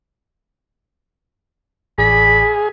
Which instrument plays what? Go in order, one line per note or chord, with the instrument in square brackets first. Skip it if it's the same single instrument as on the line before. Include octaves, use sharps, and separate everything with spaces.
[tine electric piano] A1 D5 B6 [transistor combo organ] G#4 [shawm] B5